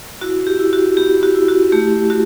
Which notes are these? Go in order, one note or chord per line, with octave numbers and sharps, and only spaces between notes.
E4 F#4
G4
E4
F#4
B3 G4
F#4
E4
F#4
A3 G4
F#4